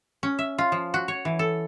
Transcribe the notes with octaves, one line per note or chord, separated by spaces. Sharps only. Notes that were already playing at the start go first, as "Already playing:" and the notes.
C#4
E5
F4
F3
F#4
C#5
E3
A4